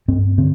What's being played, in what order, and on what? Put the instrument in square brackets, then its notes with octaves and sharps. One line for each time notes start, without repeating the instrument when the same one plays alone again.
[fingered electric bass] G2 C4
D3 C4